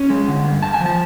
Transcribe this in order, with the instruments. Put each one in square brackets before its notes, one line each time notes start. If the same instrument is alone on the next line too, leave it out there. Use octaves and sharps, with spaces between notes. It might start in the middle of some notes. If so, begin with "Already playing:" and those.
Already playing: [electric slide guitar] C#4
G#3
D3
G2
G2 A5
G#5
F3
A5